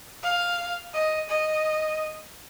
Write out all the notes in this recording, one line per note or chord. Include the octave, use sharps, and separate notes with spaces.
F5
D#5
D#5